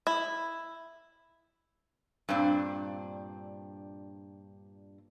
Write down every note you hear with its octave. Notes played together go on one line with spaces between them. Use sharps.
E4
G2 A#2 C4 D4